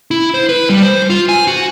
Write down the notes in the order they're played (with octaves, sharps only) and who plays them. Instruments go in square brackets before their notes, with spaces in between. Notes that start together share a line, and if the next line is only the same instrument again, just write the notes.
[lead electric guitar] E4
C5
B4
G3
C5
F4
G#5
F#4